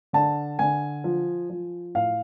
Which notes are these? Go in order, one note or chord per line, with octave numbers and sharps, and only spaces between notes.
D3 A5
D3 G#5
F3
F3
A2 F5